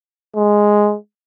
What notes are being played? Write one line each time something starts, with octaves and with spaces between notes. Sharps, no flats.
G#3